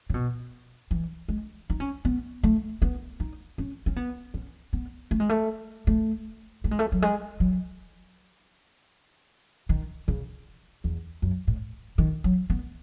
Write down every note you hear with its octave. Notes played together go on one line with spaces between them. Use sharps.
C#3
B2
E3
G#3
D#4
C#4
B3
A3
B3
D#4
C#4
C#4
B3
C#4
B3
A3
G#3
A3
A3
A3
G#3
A3
F#3
G#3
F#3
D#3
C#3
E2
F#2
A2
D#3
F#3
B3